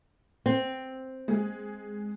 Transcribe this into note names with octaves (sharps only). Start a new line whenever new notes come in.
C4
G#3 G#4